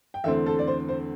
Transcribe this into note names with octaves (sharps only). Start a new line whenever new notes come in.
G5
E2 D3 A3 C4 E5
A4
D5
C5
C5